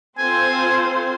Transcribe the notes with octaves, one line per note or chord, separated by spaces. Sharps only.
C4 F4 A4 C5 G#5